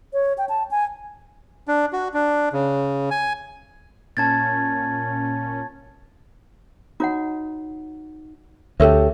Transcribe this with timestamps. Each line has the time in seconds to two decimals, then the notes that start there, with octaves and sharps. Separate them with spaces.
0.13 C#5
0.38 G5
0.49 A5
0.71 G#5
1.68 D4
1.93 F#4
2.14 D4
2.53 C#3
3.11 G#5
4.17 A#2 C#4 A5 G#6 A6
7.00 D#4 F#4 C#5 F#5
8.80 D2 G4 A4 C#5 E5